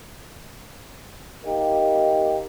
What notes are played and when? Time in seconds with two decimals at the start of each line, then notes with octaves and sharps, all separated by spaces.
1.44 A#3 D#4 G4